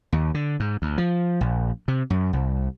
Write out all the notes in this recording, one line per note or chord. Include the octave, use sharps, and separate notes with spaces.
D#2
D3
G#2
D2
F3
A#1
C3
F#2
C2